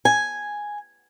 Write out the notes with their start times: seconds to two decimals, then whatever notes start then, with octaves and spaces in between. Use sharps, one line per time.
0.05 G#5